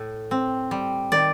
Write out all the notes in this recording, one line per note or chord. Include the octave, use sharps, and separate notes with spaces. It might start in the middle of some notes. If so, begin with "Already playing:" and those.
Already playing: A2
C4
G3
D#3 D5